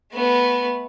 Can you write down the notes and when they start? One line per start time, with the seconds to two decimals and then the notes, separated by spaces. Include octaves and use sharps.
0.12 A3 B3